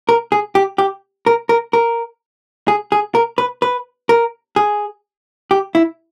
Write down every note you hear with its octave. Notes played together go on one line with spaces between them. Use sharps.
A#4
G#4
G4
G4
A#4
A#4
A#4
G#4
G#4
A#4
B4
B4
A#4
G#4
G4
E4